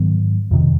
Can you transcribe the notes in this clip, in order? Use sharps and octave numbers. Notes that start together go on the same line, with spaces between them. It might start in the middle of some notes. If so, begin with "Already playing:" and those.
Already playing: G#2 D#3 F#3 B3
F2 C3 D#3